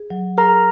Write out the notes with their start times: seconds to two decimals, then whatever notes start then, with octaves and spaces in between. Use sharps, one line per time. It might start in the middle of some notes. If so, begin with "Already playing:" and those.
Already playing: G#4
0.10 F#3
0.37 G#4 A#4 A#5